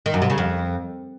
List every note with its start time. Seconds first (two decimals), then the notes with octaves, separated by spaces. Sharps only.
0.06 D#3
0.14 F#2
0.22 C3
0.30 C#3
0.38 F2